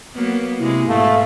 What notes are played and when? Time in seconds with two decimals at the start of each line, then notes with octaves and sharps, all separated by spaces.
0.14 F#3 A#3 B3
0.59 C3 G#3 E4
0.88 G#2 B2 A3 F5